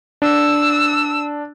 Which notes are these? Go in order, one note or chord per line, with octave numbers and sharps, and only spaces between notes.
D4 E6